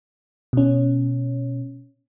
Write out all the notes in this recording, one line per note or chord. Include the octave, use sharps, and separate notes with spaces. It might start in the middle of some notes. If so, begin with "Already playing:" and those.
B2 C#4